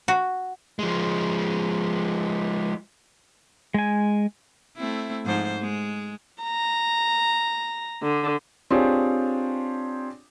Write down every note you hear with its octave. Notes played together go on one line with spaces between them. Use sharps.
F#4
F3 G#3
G#3 G#5
A3 C4 E4
G#2 F3 C5
G#3
A#5
D3
C4 D4 F4 G4 G#4 C#5